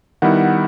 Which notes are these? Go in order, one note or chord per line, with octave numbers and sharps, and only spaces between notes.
D#3 G3 B3 E4 F#5